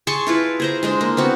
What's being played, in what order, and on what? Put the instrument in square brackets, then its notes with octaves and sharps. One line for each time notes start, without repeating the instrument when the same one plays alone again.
[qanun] G#4 A5 C6 C#6
E4 F4 B4
G#4 C5 A#5
G#3 D4 C5
A#3
B3 C4 F#4